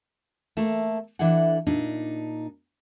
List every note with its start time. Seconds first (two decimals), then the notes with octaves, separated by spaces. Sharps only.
0.57 A3 A#3 A4
1.19 E3 D4 E4 A4 F#5
1.67 A#2 D4 D#4